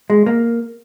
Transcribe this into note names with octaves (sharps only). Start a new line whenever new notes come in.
G#3
A#3